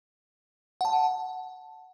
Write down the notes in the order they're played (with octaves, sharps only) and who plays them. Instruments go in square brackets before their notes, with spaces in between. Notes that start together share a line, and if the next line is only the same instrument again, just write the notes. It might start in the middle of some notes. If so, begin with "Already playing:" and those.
[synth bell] F#5 A5